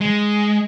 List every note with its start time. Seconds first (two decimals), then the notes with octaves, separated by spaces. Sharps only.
0.01 G#3